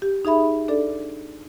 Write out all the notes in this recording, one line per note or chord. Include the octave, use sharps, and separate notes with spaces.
G4
D#4 G#4 E5 B5
D4 A4 D5